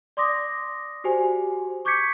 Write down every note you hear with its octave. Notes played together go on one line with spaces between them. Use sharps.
D5 C6 D6 D#6 A#6
F#4 G4 C5 G#5
C#6 D6 G6 G#6 B6 C#7